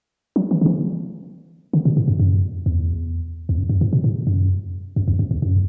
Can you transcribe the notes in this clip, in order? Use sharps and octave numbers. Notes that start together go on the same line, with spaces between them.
F#3
E3
D3
E3
D3
B2
A2
F#2
F#2
E2
E2
F#2
F#2
A2
B2
A2
F#2
F#2
E2
F#2
E2
F#2